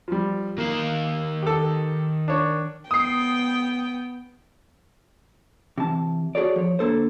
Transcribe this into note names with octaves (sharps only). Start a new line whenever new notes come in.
F3 G3
D#3 A#3 F5
G4 A4
D4 C#5
B3 G5 D#6 C7
C3 E3 A5
F#4 G#4 A4 C#5 D5
F3 C#5
D3 A#3 A4 C5